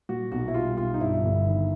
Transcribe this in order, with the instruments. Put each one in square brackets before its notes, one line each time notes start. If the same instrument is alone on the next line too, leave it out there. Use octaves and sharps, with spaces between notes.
[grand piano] A#2 F#4
B1 F#4
E4
G3 F4
B1 F4
D#4
G2 E4
G1
D#3